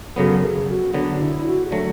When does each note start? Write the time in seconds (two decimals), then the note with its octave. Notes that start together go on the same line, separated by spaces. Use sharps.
0.16 F#2 C#3 F#3 B3 A4
0.41 G#4
0.68 F#4
0.94 D3 F#3 B3 D4
1.19 E4
1.46 F#4
1.65 G#4
1.71 D3 F#3 A3 A4